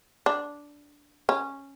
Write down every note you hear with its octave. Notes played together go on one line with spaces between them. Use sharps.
D4
C#4